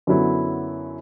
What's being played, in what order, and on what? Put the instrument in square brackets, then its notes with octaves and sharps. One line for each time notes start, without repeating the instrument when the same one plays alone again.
[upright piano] F#2 D3 F#3 B3 E4